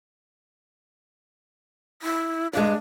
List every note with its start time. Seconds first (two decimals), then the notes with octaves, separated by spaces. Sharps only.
2.02 E4
2.53 G2 G#3 D4